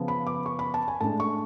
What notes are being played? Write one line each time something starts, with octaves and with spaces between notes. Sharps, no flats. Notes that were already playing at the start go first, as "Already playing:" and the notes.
Already playing: C#3 F3 B3
B5
D6
C#6
B5
A5
G#5
A2 G#3 D4 A5
C#6